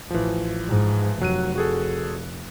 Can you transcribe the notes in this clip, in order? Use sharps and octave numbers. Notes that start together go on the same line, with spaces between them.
A1 E3 F3
G#2
F1 F#3 F#6 D#7
F#4 G#4 A4